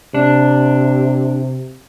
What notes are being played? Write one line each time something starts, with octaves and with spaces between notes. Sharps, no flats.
C3 D4